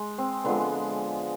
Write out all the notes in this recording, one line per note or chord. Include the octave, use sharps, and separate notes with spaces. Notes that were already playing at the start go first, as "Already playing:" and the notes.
Already playing: G#3
C4
D3 F3 G#3 B3